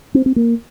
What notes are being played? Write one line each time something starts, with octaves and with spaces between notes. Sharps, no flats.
C4
C4
A#3